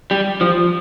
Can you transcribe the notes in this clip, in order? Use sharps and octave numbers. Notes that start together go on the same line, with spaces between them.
G3
F3